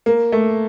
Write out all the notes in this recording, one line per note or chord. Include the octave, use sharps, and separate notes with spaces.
A#3
A3